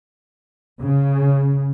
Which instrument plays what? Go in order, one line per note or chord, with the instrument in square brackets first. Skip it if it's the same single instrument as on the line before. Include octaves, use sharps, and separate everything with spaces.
[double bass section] C#3